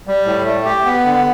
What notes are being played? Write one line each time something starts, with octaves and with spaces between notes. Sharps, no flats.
G3
A2
A3
G4
B3
D3